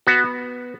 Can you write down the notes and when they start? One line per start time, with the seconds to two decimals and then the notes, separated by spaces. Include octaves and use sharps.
0.07 B3 F#4